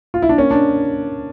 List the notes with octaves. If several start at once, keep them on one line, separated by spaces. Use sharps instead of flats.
F4
E4
D4
A#3 C#4
D4